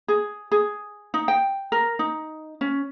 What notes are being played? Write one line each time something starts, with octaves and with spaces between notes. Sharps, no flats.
G#4
G#4
D#4
G5
A#4
D#4
C#4